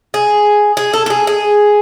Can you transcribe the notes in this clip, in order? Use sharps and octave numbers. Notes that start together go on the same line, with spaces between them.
G#4
G#4
A4
A4
G#4
G#4